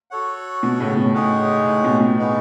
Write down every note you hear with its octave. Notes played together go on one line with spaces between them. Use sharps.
F#4 A4 C#5 F#5
B2
A2 C#3
B2
A2 G#3 D#4 G#4 C#5 F#5
A2
B2
B2
G#3 B3 D#4 F#4